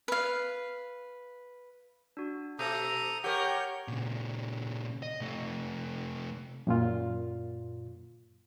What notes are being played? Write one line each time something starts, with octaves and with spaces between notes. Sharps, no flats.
B4 F5
D4 F#4
B2 A4 A#5 D#6 G6
G4 A#4 C#5 F#5 C#6 G6
A#2 C#3
D#5
C3 A3
F#2 A#2 F4